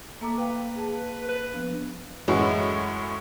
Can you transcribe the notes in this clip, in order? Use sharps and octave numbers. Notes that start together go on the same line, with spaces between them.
A3 A#3 A#5 D6
B4 F5 G5
G#4 A5
B4
F3 B3 D4
F#2 A2 E3 G#3 C#4 F#4